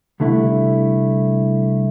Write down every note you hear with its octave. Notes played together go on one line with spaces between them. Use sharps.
C2 D3 A3 E4